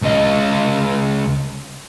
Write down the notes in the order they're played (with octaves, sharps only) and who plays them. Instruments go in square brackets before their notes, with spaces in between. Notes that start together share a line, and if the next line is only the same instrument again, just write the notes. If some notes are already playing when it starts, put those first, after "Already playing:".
[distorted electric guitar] C#2 D#5